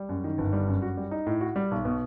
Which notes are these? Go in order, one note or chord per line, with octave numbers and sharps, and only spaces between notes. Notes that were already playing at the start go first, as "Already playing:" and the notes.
Already playing: G3
F#2
D#3
G1
G3
F#2
F#4
G3
D#4
A2
F#4
G3
B1
B2